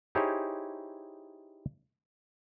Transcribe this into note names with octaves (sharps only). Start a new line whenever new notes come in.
D#4 E4 G4 G#4 C5 C#5